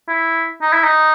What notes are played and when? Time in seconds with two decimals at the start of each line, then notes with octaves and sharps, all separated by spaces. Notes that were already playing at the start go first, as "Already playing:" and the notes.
0.08 E4
0.62 D#4
0.73 E4
0.84 D#4